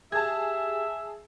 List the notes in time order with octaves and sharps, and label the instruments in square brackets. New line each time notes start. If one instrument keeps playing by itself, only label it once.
[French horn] G4 [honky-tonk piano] G#4 A5 [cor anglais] E5 [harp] G#6